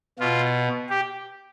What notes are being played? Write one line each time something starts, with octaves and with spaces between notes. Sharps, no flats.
B2 F4
G4